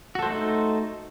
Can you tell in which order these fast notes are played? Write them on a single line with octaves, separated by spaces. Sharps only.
F#4 A4 C5 A3 D#4